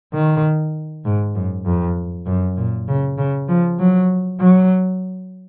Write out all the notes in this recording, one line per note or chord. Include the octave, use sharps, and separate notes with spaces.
D#3
G#2
F#2
F2
F#2
A#2
C#3
C#3
F3
F#3
F#3